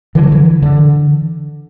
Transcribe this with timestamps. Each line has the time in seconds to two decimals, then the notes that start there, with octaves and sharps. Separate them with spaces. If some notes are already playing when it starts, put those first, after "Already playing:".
0.15 D3 E3
0.23 F#3
0.32 E3
0.63 D3